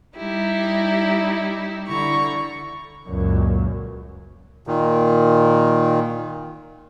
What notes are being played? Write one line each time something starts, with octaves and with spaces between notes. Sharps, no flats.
G3 D#4 E4 G4
D3 E4 A#5 C#6
C#2 F#2 A#2
A#2 D#3